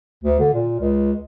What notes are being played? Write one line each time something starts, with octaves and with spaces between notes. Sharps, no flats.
D2
D3
A#2
C#2